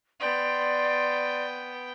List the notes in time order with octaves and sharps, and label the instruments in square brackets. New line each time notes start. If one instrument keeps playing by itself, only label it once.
[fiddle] B3 G5 [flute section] D5 C6